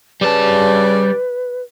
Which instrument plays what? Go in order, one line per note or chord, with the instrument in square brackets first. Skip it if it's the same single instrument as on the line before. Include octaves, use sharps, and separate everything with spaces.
[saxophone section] C#3 D5 [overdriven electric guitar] G3 A5 [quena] B4